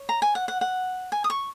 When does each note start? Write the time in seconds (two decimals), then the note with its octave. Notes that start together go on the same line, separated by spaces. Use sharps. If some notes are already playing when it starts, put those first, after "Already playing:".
Already playing: C#5
0.09 A#5
0.22 G#5
0.35 F#5
0.48 F#5
0.61 F#5
1.12 G#5
1.24 D#6
1.30 C#6